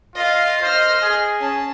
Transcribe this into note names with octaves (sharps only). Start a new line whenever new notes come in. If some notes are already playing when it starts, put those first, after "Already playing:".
F4 D#5 F5
C5 D#5 F6
G#4
C#4 A5